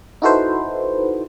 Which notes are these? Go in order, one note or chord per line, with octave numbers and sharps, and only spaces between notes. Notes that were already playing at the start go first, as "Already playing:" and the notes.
D#4 E4 F#4 A4 B4 C5